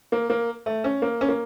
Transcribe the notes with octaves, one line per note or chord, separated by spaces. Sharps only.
A#3
A#3
A3
C#4
A#3
C#4
A#3